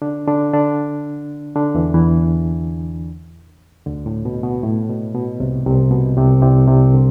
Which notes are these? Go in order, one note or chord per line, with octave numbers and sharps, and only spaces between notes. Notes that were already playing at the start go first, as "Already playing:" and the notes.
D3 D4
D3 D4
D3 D4
D3 D4
E2 E3
E2 E3
D2 D3
A2
B2
B2
A2
B2
B2
C2 C3
C2 C3
B2
C2 C3
C2 C3
C2 C3
D3